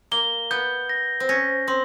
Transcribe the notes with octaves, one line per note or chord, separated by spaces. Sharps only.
A#3 G7
B3 G6
A#6
C4
C#4 A#6
C4 C6